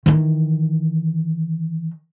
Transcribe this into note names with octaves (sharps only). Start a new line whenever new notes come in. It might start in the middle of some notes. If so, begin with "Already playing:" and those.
D#3 E3